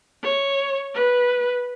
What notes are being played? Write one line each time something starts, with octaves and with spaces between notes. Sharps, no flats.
C#5
B4